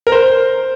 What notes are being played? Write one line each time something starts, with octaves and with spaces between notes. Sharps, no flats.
A#4
C5